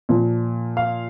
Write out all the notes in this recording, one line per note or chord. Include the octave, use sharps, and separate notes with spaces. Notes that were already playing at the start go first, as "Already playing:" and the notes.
A#2 F3
F5